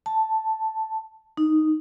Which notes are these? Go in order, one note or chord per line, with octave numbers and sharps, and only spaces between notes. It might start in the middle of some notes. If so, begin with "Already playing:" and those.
A5
D#4